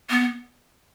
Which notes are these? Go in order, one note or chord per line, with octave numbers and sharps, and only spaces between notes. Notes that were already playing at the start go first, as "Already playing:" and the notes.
B3